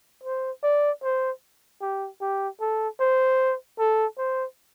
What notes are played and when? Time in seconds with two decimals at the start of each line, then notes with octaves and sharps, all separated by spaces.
0.24 C5
0.63 D5
1.03 C5
1.82 G4
2.21 G4
2.61 A4
3.00 C5
3.79 A4
4.18 C5